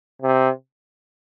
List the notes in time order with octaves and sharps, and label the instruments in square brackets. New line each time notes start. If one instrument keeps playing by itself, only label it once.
[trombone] C3